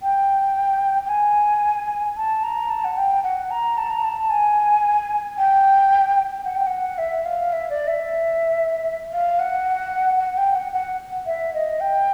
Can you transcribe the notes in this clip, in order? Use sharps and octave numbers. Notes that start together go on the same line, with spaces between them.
G5
G5
G#5
A5
A#5
A5
F#5
G5
F#5
A#5
A5
A#5
A5
G#5
G5
F#5
G5
F#5
E5
F5
E5
D5
E5
F5
F#5
F#5
G5
F#5
F#5
E5
D#5
G5